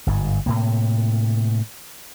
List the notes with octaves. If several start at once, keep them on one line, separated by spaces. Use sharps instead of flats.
G1 G#2
A2 C3 A#3